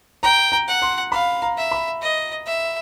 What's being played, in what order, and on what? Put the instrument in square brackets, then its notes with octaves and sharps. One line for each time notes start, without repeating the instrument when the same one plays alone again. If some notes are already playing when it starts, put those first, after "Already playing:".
[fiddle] G5 [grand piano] A#5
[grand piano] A#5
[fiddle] F#5
[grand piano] C6
[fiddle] F5 [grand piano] B5
[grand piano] A#5
[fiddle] E5
[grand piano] B5
[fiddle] D#5
E5